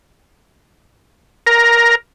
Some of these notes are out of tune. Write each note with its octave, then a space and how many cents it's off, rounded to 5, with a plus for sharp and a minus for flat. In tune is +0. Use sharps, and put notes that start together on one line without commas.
A#4 +15 A#5 +0